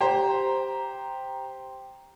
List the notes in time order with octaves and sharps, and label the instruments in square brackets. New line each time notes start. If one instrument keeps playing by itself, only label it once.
[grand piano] G4 C5 A#5